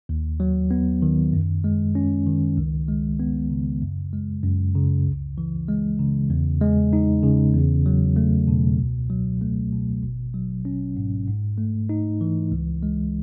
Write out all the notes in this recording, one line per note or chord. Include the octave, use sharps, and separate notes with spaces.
D#2
F#3
B3
D#3
F#2
G#3
C#4
D#3
C#2
G#3
B3
C#3
F#2
G#3
F#2
C#3
C#2
E3
G#3
C#3
E2
G#3
D#4
C#3
E2
F#3
A3
B2
C#2
F#3
A3
B2
G#1
F#3
C#4
G#2
G#2
A3
D#4
E3
C#2
G#3